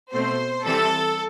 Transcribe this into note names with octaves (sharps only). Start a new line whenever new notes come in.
B2 A3 C4 C5
E3 G3 C4 A4